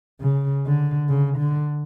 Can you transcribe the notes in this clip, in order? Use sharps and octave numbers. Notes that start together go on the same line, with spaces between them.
C#3
D3
C#3
D3